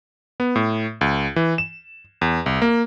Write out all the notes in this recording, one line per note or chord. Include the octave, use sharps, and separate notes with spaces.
B3
A2
C#2
E3
E7
E2
C2
A#3